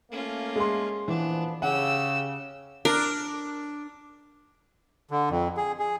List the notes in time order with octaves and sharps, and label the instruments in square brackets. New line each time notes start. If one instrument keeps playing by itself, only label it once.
[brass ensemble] A3 A#3 [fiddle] C#4 F4
[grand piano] G#3 C6
[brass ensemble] A#2 F3 B3 [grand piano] E3 [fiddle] D4
[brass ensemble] C#3 [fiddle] G4 E6 [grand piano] F#5
[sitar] D4 [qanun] A#4
[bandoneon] D3
F2
G#4
G#4